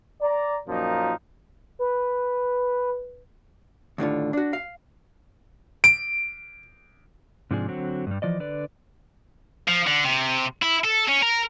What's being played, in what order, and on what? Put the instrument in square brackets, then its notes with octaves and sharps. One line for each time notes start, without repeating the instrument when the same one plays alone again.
[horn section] D5 A#5
F#2 A#2 F3 A#3 D#4
[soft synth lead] B4
[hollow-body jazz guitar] D#2 A2 D3 F4
D4 F#4
F5
[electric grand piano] D7
[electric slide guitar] G#2 C3 F3 D4 G#4
D3 F#3 C4 F#4
G2 G3
E3 F3 D5 D#5
D3 B4 D5
[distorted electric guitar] F3
D3
C3
E4
A4
C#4
A#4